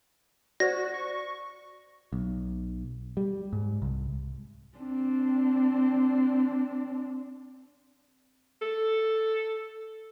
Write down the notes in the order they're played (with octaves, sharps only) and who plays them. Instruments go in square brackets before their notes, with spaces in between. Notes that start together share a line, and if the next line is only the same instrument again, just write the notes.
[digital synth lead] F#4 [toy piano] C5 D5 [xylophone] A#6
[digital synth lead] C#6
[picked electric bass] B1
G3
G#2
C2
[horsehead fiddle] C4 D4
[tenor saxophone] A4